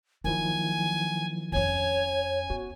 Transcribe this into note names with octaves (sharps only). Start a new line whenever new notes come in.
D#3 F3 F#3 A#3 E4 G#5
F2 C#4 C#5 G#5
B3 F#4